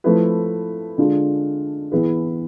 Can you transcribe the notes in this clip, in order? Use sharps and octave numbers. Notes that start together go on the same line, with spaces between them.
F3 A3 E4 B4
D3 G#3 D4 F4
E3 B3 E4 G#4 B4